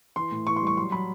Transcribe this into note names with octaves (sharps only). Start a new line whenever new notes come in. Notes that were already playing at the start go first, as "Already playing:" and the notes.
E3 C6
A2
E3 C#6
C6
G3 C#6
F#3 C6
F#3 B5